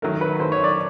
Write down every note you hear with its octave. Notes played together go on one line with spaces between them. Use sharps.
D#3 F#3 A3 A#4
B4
D#3 F#3 A3 C5
C#5
D5